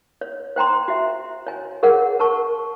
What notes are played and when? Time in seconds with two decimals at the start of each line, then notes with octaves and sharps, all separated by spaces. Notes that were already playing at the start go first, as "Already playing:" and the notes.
0.21 C#5
0.56 C5 G5 A#5 C6
0.88 F#4 E5
1.47 C#5 G#5
1.83 G#4 A#4 C#5 F#5
2.19 A#4 A5 C#6